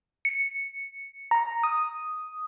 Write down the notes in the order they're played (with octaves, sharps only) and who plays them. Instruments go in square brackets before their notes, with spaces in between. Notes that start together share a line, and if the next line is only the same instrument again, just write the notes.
[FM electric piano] C#7
A#5
D#6